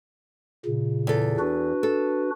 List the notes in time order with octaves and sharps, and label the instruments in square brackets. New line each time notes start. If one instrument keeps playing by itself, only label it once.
[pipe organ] A#2 C#3
[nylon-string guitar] E2 A4
[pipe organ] D4 F#4 B4
[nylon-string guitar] A4